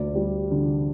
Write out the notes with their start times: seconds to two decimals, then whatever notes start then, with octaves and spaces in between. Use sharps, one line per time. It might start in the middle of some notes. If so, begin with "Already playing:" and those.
Already playing: D2 D5
0.15 G3
0.51 D3